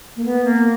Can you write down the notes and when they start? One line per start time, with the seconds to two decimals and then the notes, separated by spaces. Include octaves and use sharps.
0.16 A#3
0.25 B3
0.45 A#3